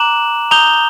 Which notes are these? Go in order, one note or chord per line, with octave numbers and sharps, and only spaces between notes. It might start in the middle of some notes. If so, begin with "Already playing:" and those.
Already playing: A#5 D6 F#6 E7 F#7
A#5 D#6 G6 F7 G7